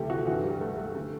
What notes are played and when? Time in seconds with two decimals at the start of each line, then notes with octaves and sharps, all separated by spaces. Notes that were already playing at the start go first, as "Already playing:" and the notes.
Already playing: D2 C3 E3 A3 G4
0.10 F#4
0.27 G2 E3 F#4
0.44 G3
0.61 A3
0.78 A3
0.95 D3 A3